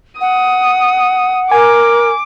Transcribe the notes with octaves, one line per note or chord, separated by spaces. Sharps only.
F#5 D#6
A#4 G#5 D6